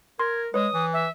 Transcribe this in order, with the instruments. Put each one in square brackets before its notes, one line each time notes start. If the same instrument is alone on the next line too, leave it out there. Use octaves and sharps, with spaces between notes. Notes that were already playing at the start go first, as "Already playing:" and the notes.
[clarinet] A#4 [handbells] C6 [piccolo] G#6
[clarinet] G#3 [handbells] B4 C#5 [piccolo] D#6
[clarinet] E3
[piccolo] E5